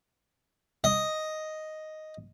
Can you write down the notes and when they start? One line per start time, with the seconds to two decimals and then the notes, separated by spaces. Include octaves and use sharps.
0.84 D#5